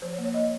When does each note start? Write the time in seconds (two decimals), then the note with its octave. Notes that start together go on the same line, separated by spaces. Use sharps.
0.02 F3 C5
0.13 C#5
0.18 A#3
0.24 C#5
0.34 A#3 D#5